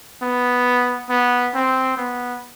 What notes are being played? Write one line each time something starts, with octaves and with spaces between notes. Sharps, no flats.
B3
B3
C4
B3